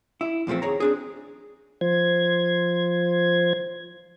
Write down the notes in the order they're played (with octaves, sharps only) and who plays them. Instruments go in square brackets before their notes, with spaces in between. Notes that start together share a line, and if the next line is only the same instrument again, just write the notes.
[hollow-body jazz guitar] E4
E2 A#2 F3 A3 C4
D#2 G#4 C#5 A#5
C4 D4 G#4
[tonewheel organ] F3 C5 G#6